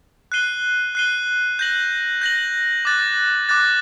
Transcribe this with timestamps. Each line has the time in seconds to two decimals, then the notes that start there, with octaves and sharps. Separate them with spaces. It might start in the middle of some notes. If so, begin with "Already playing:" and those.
0.32 F#6 C7 D#7 G7
0.95 F#6 C7 D#7 G7
1.59 G6 A#6 F#7
2.21 G6 A#6 F#7
2.85 D6 F#6 A6
3.49 D6 F#6 A6